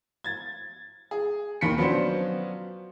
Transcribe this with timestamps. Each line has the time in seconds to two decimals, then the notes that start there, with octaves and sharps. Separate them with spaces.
0.24 G#6 A6
1.11 G#4
1.61 D#2 D#3 B5 B6 C#7
1.77 F3 F#3 B3 C#4 D4 C5